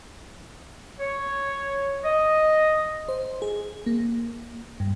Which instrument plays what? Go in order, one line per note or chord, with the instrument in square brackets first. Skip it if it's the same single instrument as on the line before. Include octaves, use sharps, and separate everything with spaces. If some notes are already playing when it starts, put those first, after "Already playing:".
[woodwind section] C#5
D#5
[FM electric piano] C5
G#4
A#3
G2